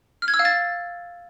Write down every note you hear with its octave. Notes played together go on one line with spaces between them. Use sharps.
F6
G#6
E6
F5
A6